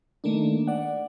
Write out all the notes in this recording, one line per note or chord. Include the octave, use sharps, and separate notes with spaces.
D#3 A3 A#3 D4
D5 F#5